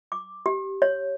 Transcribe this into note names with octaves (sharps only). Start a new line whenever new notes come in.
D6
G4
C#5